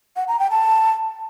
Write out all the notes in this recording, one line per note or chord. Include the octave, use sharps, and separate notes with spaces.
F#5
A#5
G5
A5